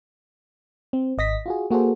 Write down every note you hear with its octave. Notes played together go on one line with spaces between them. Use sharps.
C4
G#1 D#5 A#6 B6
F4 F#4 G#4
A#3 F#4 G#4 A4 C5